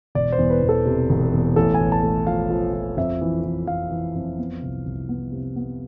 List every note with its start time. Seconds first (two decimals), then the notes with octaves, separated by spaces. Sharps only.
0.15 E1 D5
0.32 C5
0.39 E2
0.50 B4
0.62 E2
0.69 A4
0.86 C3
1.09 E1
1.33 E2
1.56 A1 A4
1.74 G#5
1.80 A1
1.92 A5
2.03 A3
2.27 F3 F5
2.50 F3
2.73 F3
2.97 F2 E5
3.22 E3
3.44 E3
3.67 F2 F5
3.91 E3
4.15 F2
4.38 B3
4.62 C2
4.86 C2
5.09 B3
5.32 C3
5.56 B3